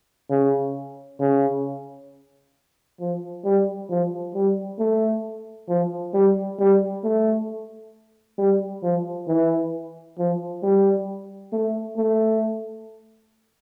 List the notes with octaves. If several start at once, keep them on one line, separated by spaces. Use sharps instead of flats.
C#3
C#3
F3
G3
F3
G3
A3
F3
G3
G3
A3
G3
F3
E3
F3
G3
A3
A3